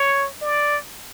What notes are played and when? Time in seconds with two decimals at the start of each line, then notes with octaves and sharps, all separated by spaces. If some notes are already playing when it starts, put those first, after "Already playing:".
Already playing: C#5
0.41 D5